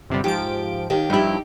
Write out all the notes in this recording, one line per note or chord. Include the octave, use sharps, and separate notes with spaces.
G1 C3 G3
G#2 F3 G4 D7
D#2 D#3 G4
G2 F3 D#4 E4 G4